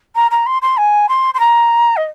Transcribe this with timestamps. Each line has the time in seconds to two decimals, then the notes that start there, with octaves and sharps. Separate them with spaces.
0.15 A#5
0.31 A#5
0.46 C6
0.62 C6
0.77 G#5
1.09 C6
1.34 C6
1.40 A#5
1.97 D#5